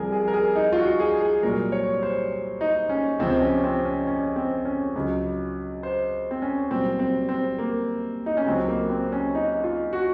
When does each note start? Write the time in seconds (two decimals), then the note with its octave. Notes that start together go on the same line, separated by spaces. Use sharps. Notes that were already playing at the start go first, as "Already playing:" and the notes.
Already playing: C2 C3 F3 G#4 A#4
0.12 G#4
0.28 A#4
0.33 G#4
0.56 D#4
0.73 F4
0.78 F#4
1.00 G#4
1.21 G#4
1.43 C2 A#2 F#3 A#4
1.72 C#5
2.03 C5
2.61 D#4
2.89 C#4
3.19 C#2 C3 F3 C4
3.30 C4
3.41 C#4
3.64 C4
3.85 C#4
4.07 C#4
4.36 C4
4.65 C#4
4.96 C#2 C#3 F#3
5.83 C5
6.31 C4
6.42 C#4
6.71 C2 A#2 F#3 C4
6.99 C4
7.29 C4
7.58 A#3
8.26 D#4
8.37 C#4
8.46 C#2 C#3 F#3 C4
8.68 A#3
8.90 C4
9.12 C#4
9.35 D#4
9.64 F4
9.93 F#4